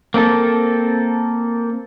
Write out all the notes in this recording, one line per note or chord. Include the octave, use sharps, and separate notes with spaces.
A#3 C4 D4 A4